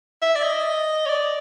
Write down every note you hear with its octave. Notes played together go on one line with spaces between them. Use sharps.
E5
D5
D#5
C#5
D5